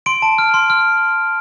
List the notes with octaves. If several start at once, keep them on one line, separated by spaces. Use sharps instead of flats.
C6 D7
A5
F6
C6
F6